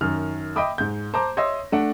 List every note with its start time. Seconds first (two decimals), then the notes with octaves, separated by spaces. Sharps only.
0.01 F#2 D#3 F6
0.56 D#5 E5 G5 B5 D6 D#6
0.78 G#2 G6
1.14 C5 A5 A#5 D6
1.37 C#5 D#5 E5 C6 E6 A#6
1.72 A3 D4 F#5